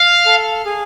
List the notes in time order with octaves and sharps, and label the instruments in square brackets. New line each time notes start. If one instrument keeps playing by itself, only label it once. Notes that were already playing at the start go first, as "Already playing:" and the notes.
Already playing: [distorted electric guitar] F5
[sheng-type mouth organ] A4
G#4